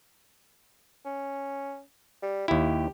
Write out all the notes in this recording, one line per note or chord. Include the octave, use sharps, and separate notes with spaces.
C#4
G3
D#2 E4 G4